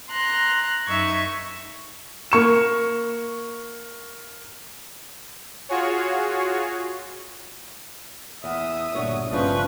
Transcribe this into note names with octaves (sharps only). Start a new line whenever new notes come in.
A#5 C6 F#6
F#2 D#4 E5 C#6 G#6
A#3 C#6 E7
F4 F#4 G#4 C#5
E2 E5 D#6
G1 A#2 D4 F#4 C#5
G1 C#3 F3 C#4 D4 F4 B4 C#6